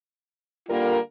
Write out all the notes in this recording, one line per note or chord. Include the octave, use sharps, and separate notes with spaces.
D3 G3 A#3 F4 A#4